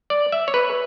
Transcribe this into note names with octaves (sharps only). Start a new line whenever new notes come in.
D5
E5
C#5
B4